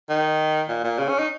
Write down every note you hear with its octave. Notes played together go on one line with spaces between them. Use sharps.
D#3
A#2
A#2
C#3
C#4
D#4